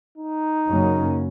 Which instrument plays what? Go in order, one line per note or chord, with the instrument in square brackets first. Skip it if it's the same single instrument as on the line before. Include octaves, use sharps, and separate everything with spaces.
[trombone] D#4
[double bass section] F#2 C#3 F#3 A#3 C#4